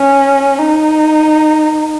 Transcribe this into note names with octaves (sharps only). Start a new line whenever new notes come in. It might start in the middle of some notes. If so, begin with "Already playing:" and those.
Already playing: C#4
D#4